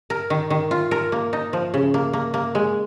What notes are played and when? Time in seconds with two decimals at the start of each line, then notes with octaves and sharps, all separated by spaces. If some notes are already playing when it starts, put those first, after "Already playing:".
0.10 A#4
0.30 D#3
0.50 D#3
0.71 F4
0.91 A#4
1.12 A#3
1.33 D#4
1.53 F3
1.74 C#3
1.94 A#3
2.13 A#3
2.34 A#3
2.55 G#3